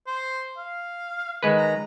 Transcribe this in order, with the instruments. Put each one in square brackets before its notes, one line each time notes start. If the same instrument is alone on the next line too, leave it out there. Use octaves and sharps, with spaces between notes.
[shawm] C5
F5
[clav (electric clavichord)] D#3 G#3 B4
[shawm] A#5